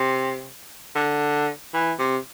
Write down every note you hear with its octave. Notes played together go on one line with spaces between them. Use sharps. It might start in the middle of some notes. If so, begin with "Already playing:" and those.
Already playing: C3
D3
E3
C3